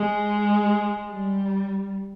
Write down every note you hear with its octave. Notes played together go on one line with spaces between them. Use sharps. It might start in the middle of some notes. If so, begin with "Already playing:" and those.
Already playing: G#3
G3